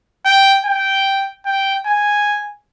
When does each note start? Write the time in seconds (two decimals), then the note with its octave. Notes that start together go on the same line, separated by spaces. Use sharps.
0.25 G5
0.65 G5
1.46 G5
1.86 G#5